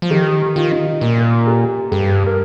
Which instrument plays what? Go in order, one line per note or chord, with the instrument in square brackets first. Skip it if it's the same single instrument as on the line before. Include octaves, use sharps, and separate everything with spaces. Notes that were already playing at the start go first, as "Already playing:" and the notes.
[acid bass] F3
[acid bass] D#3 [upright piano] G4
[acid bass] D#3 [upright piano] F4
[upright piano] D#4
F4
[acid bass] A#2 [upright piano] A#4
[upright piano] A#4
G4
[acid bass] G2 [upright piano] G4
[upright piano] A#4